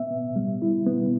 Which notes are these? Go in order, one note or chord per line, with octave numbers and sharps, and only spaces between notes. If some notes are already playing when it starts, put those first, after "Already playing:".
Already playing: B3 E5
B3
G3
E4
B3